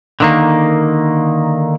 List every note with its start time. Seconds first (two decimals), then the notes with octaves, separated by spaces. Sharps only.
0.20 D3 D#3 A#3